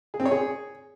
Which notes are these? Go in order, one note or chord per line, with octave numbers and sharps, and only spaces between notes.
G#4
C4
C#5
G#4